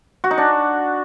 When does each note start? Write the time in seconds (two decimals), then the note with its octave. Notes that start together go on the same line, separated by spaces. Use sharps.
0.24 F#4
0.31 D#4
0.38 D4